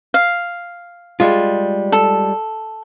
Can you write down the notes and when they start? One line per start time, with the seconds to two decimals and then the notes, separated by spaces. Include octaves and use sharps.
0.14 F5
1.20 G3 G#3 F4
1.92 A4